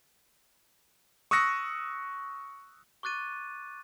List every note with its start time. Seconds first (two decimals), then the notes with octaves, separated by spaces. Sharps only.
1.31 C#6 D#6 E6 F#6 A#6 C#7
3.03 C#6 D6 F#6 A6 D#7